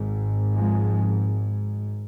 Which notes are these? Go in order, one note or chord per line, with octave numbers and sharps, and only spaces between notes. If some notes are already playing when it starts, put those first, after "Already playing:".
Already playing: G#1 G#2
F3 G#3